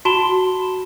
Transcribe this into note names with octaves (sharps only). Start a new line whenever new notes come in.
F#4 A5 B5 C6 E7 G7